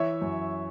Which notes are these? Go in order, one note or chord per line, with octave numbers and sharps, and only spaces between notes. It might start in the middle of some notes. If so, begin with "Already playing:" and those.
Already playing: E3 C#5 E5
F#2